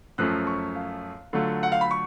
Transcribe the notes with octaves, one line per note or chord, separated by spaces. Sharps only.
F#2 F3 A3 C#4 F#6
C#6
F5
D3 F#3 A3 F4
F#5
F5
B5
C#6